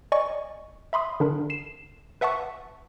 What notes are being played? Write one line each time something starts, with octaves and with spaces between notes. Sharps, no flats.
D5 D#5 G#5 C#6
E5 B5 C6 D#6
D3 D4 A#4
C7 E7
B4 E5 F#5 A5 C#6